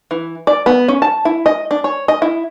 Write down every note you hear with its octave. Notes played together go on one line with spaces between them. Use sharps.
E3
D5
B3
C#4
A5
E4
D#5
D4
C#5
D#5
E4